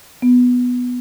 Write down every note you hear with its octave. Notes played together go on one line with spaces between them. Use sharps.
B3